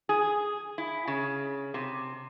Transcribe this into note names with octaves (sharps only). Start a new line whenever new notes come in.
G#4
E4
C#3
C3